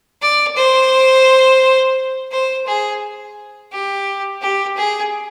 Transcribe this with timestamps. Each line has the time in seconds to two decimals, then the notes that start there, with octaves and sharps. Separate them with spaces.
0.22 D5
0.56 C5
2.31 C5
2.67 G#4
3.72 G4
4.42 G4
4.77 G#4